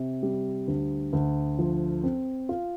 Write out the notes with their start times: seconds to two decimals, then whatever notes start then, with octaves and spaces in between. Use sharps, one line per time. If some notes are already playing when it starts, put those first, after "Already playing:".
Already playing: C3
0.23 G3
0.68 D2
1.13 D2
1.59 F3
2.03 C4
2.49 F4